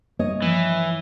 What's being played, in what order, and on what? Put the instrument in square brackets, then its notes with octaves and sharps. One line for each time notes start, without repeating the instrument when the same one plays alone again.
[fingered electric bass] G2 [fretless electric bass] A#3 [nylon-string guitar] C#5 D#5
[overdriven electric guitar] E3 [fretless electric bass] F3